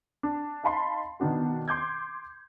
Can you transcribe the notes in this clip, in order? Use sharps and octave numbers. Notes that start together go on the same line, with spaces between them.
D4
D#4 F5 A5 B5 C6
B2 D#3 B3 D4 F#4
C6 D6 G6 G#6